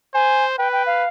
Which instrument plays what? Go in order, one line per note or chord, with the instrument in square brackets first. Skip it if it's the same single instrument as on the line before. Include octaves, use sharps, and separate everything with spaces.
[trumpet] C5 [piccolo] G#5
[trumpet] B4 [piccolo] G5
[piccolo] G5
F5